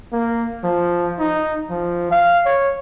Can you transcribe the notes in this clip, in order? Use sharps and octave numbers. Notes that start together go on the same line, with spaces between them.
A#3
F3
D#4
F3
F5
C#5